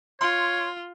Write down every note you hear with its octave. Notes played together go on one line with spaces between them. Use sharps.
F4 C#5 C6